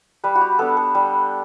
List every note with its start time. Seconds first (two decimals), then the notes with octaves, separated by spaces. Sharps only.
0.24 G3 B4
0.35 F#4
0.41 G4
0.59 B3 D4 A4
0.77 A4
0.95 G3